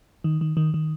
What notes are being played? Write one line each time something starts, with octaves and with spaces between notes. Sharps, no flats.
D#3
D#3
D#3
D#3